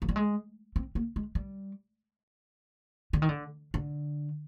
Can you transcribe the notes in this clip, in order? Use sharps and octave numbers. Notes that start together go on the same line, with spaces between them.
F3
G3
G#3
C4
A#3
G#3
G3
D3
D#3
D3
D3